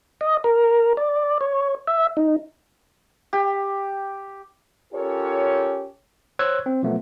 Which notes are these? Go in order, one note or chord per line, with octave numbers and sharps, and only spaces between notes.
D#5
A#4
D5
C#5
E5
D#4
G4
C#4 F4 G4 A4 A#4 C#5
C5 C#5 E6 F#6 G#6
C4
B2 F3 F#3 A3 B3